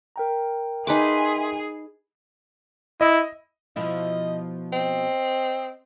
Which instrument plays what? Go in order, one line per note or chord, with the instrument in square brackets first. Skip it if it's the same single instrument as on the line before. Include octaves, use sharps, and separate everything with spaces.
[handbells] A#4 G5 A#5
[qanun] D#4 B4 D6 [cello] G#4 [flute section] E5 G#5 C6
[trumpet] E4 [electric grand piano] D#5
[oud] B2 F3 E4 [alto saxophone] D#5
[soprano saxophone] C4 [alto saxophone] D#5